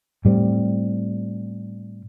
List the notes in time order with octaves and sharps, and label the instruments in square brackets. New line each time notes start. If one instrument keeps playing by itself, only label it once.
[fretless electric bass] A2 G3 B3 C4